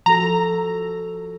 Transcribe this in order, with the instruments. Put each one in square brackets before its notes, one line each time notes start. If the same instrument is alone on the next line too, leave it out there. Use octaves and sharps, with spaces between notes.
[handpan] F3 F#4 A4 [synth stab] A#5